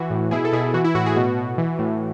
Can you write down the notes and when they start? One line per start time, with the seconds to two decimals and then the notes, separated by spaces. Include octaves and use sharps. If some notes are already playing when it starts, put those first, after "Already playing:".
Already playing: E3 F#4
0.10 A2
0.31 B2 E4 G#4
0.45 A4
0.53 B2 E4 G#4
0.74 E3 F#4
0.84 E4
0.95 A2 F#4
1.06 E4 G#4
1.16 B2 F#4
1.37 B2
1.58 E3
1.79 A2